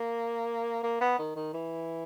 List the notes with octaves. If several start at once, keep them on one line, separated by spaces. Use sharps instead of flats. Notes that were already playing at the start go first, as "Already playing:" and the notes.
Already playing: A#3
A#3
B3
D#3
D#3
E3